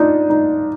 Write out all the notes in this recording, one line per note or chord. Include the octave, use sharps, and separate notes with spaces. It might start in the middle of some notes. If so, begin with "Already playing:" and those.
Already playing: D4 D#4 F4
D#4